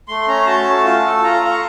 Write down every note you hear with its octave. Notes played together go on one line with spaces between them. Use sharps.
A3 C6
C#4 A#5
F#4 A5
A3
F4
A4
F4 A#5
F4
C#6